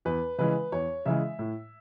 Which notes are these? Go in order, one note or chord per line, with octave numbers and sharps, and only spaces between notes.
E2 B4
C#3 E3 G#3 B4
E2 C#5
C#3 E3 G#3 E5
A2